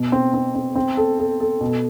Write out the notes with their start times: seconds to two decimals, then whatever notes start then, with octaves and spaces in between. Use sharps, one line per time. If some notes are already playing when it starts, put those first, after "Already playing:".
Already playing: B2
0.12 C4
0.34 C4
0.55 C4
0.75 C4
0.97 A4
1.19 A4
1.40 A4
1.61 B2